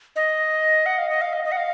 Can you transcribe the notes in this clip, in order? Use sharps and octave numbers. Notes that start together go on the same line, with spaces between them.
D#5
F#5
F5
D#5
F5
D#5
D#5
F#5
F5